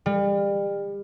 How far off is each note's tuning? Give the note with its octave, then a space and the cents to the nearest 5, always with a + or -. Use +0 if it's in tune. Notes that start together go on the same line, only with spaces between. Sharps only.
G3 +35